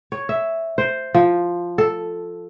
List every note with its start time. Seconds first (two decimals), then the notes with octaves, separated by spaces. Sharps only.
0.12 C#5
0.29 E5
0.78 C5
1.14 F3
1.78 A4